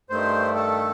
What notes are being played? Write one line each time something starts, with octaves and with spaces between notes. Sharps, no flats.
G2 D#3 A3 C5
A4